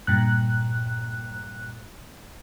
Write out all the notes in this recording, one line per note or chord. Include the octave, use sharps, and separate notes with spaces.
G2 A#2 F#6